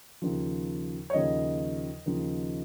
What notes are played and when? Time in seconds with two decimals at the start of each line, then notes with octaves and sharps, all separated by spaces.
0.22 D#2 C#3 F3
1.10 C#5
1.13 D#2 C#3 F3 D#5
2.06 D#2 C#3 F3